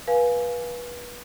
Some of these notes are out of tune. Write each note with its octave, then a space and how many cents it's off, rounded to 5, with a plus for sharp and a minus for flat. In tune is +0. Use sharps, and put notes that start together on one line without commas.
B4 -25 F5 +0 G#5 +10